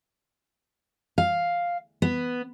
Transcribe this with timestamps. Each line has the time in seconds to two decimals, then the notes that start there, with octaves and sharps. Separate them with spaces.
1.18 F5
2.02 B3